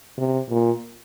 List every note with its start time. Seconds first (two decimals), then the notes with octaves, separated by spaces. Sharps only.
0.18 C3
0.49 A#2